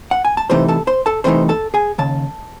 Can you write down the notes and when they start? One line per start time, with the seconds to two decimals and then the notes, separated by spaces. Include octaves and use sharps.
0.11 F#5
0.25 G#5
0.37 A5
0.50 C2 C3 E3 A3 D#4 C5 C6
0.68 A4 A5
0.87 C5 C6
1.06 A4 A5
1.24 C2 C3 E3 A3 D#4 C5 C6
1.49 A4 A5
1.74 G#4 G#5
1.98 D#2 C#3 A5